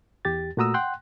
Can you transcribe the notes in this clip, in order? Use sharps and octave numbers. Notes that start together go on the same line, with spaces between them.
E2 G4 A6
A#2 A3 F#4 A#5 D#6 E6
F#5 G5 C6 F#6